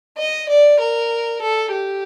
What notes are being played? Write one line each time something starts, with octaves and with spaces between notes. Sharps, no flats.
D#5
D5
A#4
A4
G4